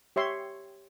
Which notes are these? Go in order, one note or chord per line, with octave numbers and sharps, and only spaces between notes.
G4 C#5 E5 C6